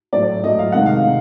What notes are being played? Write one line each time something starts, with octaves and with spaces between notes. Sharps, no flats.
A2 F#3 A3 D5
A2 F#3 A3 D#5
F5
C3 D#3 G#3 F#5
F5
C3